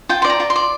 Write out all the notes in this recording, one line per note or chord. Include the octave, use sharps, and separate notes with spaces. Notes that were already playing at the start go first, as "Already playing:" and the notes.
F4 G5
C6
D5
A#5
F4
C6
D5